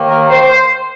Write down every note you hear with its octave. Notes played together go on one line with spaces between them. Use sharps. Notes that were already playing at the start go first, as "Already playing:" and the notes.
Already playing: D#2 D#3 A#3
A#4
C5
C5